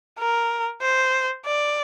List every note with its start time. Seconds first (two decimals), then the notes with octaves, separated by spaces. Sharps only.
0.19 A#4
0.82 C5
1.45 D5